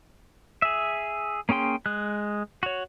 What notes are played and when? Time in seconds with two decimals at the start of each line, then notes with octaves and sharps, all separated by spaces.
0.62 G#4 E5
1.49 A#3 C#4 G#4 G5 C6
1.86 G#3 F#6
2.63 F#4 C#5